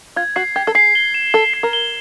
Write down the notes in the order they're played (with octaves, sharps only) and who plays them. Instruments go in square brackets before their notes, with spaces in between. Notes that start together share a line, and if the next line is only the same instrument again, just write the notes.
[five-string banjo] F4 [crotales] G#6
[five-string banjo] F#4 [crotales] C7
[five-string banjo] G4 [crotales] G#6
[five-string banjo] A4
[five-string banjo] G#4 [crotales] C7
[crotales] G7
E7
[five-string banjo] A4 [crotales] E7
[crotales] C7
[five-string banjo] A#4
[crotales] G7